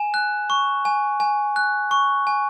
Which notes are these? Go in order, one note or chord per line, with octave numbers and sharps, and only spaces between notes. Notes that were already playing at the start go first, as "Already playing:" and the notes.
Already playing: G#5 E7
F#6
C#6
G#5
G#5
F#6
C#6
G#5